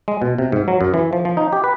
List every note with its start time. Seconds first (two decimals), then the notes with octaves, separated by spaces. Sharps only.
0.08 G#3
0.22 B2
0.38 C3
0.52 G#2
0.68 F#3
0.81 F#2
0.94 E3
1.13 F3
1.25 F3
1.37 D#4
1.53 G4
1.64 B4